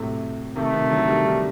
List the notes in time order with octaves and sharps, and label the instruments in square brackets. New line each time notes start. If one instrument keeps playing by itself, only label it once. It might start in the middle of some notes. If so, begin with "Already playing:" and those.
Already playing: [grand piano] A2 C3 F#3 A3
[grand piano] C3 D#3 [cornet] A3
[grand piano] C3 D#3
D3 F#3
D#3 G3
D#3 G3